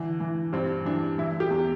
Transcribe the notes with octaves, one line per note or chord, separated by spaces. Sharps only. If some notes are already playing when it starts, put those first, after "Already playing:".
Already playing: D3 E3
E3
G2 C4
E3 D4
E3 E4
G4
E2